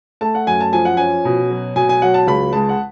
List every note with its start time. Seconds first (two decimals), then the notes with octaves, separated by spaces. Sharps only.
0.21 A3 A5
0.35 F#5
0.47 F#2 G#5
0.60 A5
0.73 F3 G#5
0.85 F#5
0.97 C#4 G#5
1.25 B2
1.50 F#3
1.76 B2 G#5
1.89 G#5
2.02 F#3 F#5
2.14 A5
2.27 C#2 B5
2.53 G#3 A5
2.69 F#5